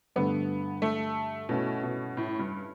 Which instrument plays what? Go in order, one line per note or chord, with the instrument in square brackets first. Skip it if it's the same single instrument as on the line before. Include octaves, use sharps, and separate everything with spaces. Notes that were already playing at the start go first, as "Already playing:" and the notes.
[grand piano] G2 D3 A3 D4 [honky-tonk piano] B3
[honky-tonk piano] A3
[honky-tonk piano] B2 [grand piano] A3 C#4 E4
[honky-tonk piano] B2
A2
G2